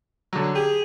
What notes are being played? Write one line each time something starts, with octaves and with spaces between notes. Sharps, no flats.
D3 F#3
G4 G#4